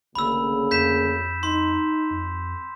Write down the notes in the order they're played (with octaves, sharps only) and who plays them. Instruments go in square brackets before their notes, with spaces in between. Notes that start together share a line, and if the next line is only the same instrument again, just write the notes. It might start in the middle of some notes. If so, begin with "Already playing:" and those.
[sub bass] G#1 [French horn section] D2 C#3 A#3 [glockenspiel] B5 E6
[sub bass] F2 [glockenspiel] G6 B6 E7
[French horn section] D#4 [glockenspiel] C6
[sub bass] F2